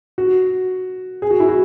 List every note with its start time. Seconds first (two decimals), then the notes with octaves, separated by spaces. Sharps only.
0.18 F#4
1.22 G#4
1.31 F#4
1.40 E4
1.49 F#4